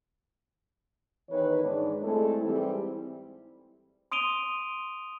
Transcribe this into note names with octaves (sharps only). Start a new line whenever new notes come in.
E2 D#3 E3 B4 C#5
G#2 D4
G#3 A3 C4 E4 A4
G#2 E3 G3 C4 E4
C6 D#6 D7 D#7 F7 G7